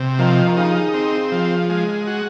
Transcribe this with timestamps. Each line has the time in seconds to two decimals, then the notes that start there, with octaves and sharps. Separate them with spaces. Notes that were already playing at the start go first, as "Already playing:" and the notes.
Already playing: C3
0.19 D#3 F3
0.46 D#3
0.57 C#3 D#4
0.94 C4
1.32 F3
1.70 G#3
2.07 F#4